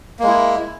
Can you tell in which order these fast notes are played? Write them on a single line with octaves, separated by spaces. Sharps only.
A#3 G#3 E4